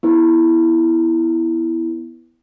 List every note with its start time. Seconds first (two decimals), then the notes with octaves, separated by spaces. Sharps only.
0.03 B3 E4 B4